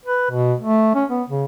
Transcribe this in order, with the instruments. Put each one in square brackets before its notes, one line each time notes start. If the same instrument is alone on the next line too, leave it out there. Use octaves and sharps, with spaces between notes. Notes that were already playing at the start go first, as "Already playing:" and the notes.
[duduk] B4
B2
A3
C#4
B3
C#3